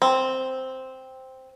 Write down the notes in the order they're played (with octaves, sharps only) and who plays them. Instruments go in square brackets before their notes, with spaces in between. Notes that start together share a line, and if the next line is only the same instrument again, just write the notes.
[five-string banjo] C4